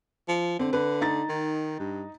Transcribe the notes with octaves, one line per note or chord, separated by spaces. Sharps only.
F3
D3 C4
D3 B4
D#4 A#5 A6
D#3
G2